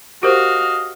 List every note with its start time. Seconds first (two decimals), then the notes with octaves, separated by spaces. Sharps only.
0.23 F#4 G4 A#4 C5 D#5 F5